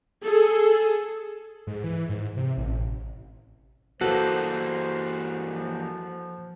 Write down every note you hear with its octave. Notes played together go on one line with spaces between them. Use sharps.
G#4 A4
G#2
E3
G#2
C3
A1
E3 A#3 F#4 A4 B4 C5
F3